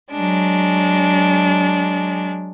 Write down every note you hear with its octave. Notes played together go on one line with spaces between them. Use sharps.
F#3 G#3 D4